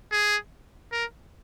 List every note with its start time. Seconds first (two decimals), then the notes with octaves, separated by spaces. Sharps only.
0.12 G#4
0.92 A#4